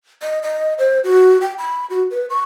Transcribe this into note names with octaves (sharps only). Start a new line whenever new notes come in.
D#5
D#5
C5
F#4
G5
B5
F#4
B4
C#6